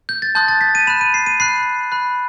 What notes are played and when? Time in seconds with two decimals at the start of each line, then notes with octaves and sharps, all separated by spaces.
0.09 G6
0.22 A6
0.35 A5 C6 D#6 F#6 G6
0.48 A6
0.61 B6
0.75 D#7
0.87 B5 F#6 E7
1.01 D#7
1.14 C7
1.26 D#7
1.40 B5 F#6 C7
1.92 B5 F#6